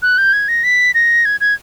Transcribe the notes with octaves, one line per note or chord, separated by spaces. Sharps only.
F#6
G6
G#6
A#6
B6
A#6
G#6
G#6